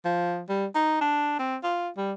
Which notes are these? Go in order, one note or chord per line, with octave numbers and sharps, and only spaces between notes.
F3
G3
D#4
D4
C4
F4
G3